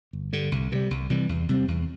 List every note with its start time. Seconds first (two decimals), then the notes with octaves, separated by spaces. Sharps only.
0.13 G1
0.33 G2 D3
0.52 C2
0.72 C3 E3
0.75 G3
0.91 C2
1.10 C3 E3 G3
1.29 E2
1.49 C3 G3 C4
1.68 E2